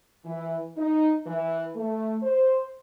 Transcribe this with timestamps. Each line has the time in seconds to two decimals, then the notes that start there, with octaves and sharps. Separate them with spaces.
0.25 E3
0.76 D#4
1.27 E3
1.75 A3
2.22 C5